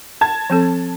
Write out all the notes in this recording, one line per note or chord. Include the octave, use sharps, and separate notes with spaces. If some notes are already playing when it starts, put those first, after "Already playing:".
A5 G#6
F3 C4 A4